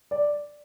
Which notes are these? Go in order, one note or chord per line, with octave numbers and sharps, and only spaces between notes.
D5